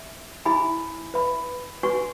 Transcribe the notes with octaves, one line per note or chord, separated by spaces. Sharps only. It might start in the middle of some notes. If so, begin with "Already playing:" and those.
Already playing: E5
E4 G#4 E5 G#5 B5
B4 E5 B5
F#4 B4 G#5 C#6